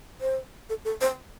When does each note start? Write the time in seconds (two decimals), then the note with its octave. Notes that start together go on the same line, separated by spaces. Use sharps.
0.21 C5
0.69 A4
0.85 A4
1.01 C5